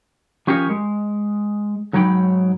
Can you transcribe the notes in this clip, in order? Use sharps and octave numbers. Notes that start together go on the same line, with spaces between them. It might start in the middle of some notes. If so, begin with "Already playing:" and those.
F3 C#4 G4 G#4 A#4 C#5
G#3
G#2 F#3 D#4 C#5 G5 B5